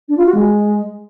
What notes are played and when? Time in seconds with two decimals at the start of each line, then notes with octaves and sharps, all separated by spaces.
0.09 D4
0.17 F4
0.26 F#4
0.35 G#3